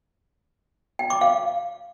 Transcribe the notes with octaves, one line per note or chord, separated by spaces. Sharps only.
G5
D6
F5